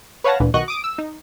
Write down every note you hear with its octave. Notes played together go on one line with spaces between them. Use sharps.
B4 C#5 F5 F#5 A5 A#6
D2 A#2 D3 E3
B1 D#3 F#4 D#5 C#6 F#6
D6 D#6 D7
E6
D#4